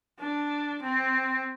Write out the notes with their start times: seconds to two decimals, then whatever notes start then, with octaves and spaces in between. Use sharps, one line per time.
0.19 D4
0.82 C4